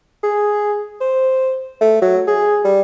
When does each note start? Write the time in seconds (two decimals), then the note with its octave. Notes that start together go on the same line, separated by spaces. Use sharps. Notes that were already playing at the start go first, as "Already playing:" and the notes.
0.23 G#4
1.01 C5
1.81 A3
2.02 F#3
2.27 G#4
2.65 G3